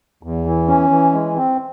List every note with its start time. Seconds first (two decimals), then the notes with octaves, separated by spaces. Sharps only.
0.23 E2
0.45 E3
0.68 C#4
0.90 E3
1.13 G#3
1.36 C4